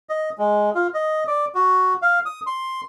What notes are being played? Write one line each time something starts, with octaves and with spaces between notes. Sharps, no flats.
D#5
G#3
F4
D#5
D5
F#4
F5
D#6
C6